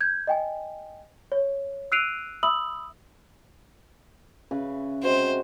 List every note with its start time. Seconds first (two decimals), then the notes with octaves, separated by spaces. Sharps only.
0.01 G6 G#6
0.27 D#5 G5 G#5
1.32 C#5
1.92 E6 F#6 C7 D7 D#7 F7
2.43 E5 B5 D#6 E6 F#7
4.51 C#3 B4 E5
5.03 C3 G#3 F#4 C5